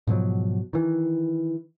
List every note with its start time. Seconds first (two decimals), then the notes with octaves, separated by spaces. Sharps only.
0.07 G#2 B2 F3 F#3
0.73 D#3 E3